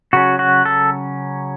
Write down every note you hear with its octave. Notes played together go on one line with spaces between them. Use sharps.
C#3 F#3 C#4 F#4
F#4
A4